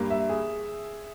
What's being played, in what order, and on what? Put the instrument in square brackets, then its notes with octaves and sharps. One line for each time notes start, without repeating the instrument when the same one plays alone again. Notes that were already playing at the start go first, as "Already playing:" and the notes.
Already playing: [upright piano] G2 G3 A#3
[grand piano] E5
G#4